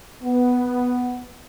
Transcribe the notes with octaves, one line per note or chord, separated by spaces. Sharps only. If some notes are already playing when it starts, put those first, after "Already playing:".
B3